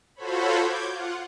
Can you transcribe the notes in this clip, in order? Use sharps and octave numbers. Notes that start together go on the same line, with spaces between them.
F4 F#4 A4 C5 C#5 B5
D6 G6 G#6
F4 F#5